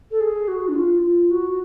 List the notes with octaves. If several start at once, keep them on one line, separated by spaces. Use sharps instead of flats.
A4
G#4
F#4
D4
F4
F4
F#4